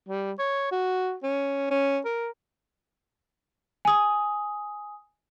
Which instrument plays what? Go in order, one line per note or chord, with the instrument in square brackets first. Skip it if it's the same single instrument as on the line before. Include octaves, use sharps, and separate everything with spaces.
[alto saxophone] G3
C#5
F#4
C#4
C#4
A#4
[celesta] G#5 D#6